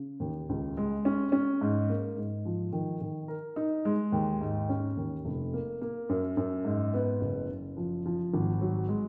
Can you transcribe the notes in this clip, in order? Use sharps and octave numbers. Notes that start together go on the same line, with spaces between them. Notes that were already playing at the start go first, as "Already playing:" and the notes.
Already playing: C#3
D#2
C#2
G#3
C#4
C#4
G#2
A#3
G#2
F3
D#3
D#3
A#4
D#4
G#3
D#2
G#2
C#4
D#2
F1
A#3
A#3
F#2
F#2
G#2
B3
F#1
F#1
F3
F3
G#1
F#3
G#3